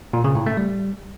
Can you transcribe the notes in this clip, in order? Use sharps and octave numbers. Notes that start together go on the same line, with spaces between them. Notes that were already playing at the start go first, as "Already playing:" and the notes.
A#2
C#3
A2
A3
G3